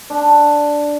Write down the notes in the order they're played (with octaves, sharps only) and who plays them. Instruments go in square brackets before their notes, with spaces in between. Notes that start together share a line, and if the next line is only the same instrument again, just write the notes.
[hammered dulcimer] D4